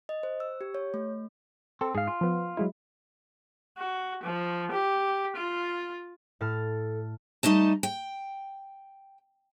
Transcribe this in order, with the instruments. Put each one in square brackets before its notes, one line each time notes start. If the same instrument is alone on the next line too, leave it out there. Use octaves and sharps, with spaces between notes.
[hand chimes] D#5
C5
E6
G4
C#5
A3
[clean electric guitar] C4 [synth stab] A4
[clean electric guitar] G#2 F5 [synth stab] G#4
[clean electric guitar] F4
[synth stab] F3 B3
F#3 G#3 E4
[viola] F#4
F3
G4
F4
[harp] A2 A5 F6 [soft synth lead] A4
[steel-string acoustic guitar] G3 A3 D#4 D#5 A5
G5